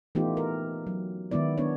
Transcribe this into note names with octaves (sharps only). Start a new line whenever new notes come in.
E3 A3 B3 D#4 F4 G4
A#4
F#3
D#3 G#3 B3 E4 D5
B3 D4 C#5